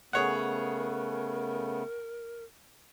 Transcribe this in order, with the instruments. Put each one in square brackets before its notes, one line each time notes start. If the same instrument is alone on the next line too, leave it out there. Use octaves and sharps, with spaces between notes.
[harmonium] C#3 A3 B3 [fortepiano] G#4 C#5 F#5 [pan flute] A#4